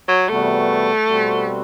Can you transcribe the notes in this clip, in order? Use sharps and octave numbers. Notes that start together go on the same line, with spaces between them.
F#3
E2 C3 G3 A3 B3 F#4
B2 G3 C4 F#4